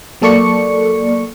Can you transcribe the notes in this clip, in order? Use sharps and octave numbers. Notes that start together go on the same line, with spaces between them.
F#3 A#3 A4 D5 C#6 C#7